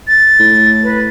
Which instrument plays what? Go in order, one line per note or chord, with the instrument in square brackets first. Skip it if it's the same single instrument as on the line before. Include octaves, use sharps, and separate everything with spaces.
[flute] A6
[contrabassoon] A2
[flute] B4